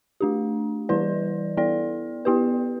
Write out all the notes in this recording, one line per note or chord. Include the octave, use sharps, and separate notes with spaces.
A3 D4 G4
E3 G3 E4 B4 D5
B3 E4 A4 D5
B3 E4 G4 B4